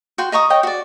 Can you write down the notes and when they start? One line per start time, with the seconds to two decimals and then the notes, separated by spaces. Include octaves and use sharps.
0.18 F#4 G5 C6
0.32 D#5 A#5 C#6 D#6
0.50 C#5 D#5 G5
0.63 F#4 D5